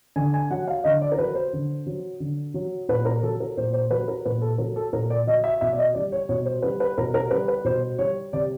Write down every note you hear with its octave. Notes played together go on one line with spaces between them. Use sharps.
D3 G#5
G#5
F#3 F#5
F5
D3 D#5
D5
A#4
F#3 B4
C5
D3
F#3
D3
F#3
A#2 B4
A#4
F#3 A4
A#4
A#2 C5
C5
F#3 B4
A#4
A#2 B4
A4
F#3 A#4
A4
A#2 A#4
D5
F#3 D#5
E5
B2 E5
D5
D#5
G3 D5
C#5
B2 C#5
C5
G3 B4
B4
B2 A#4
A#4
G3 B4
B4
B2 C5
G3 C#5
C3 D5